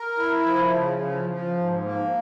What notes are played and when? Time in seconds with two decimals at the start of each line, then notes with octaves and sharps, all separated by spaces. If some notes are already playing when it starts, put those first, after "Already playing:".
Already playing: A#4
0.18 E4
0.46 F3
0.74 C#3
1.02 F3
1.30 F3
1.58 G#2
1.85 A#3